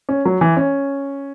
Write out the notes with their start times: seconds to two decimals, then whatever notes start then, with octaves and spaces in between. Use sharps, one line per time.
0.09 C#4
0.25 F#3
0.41 E3
0.57 C#4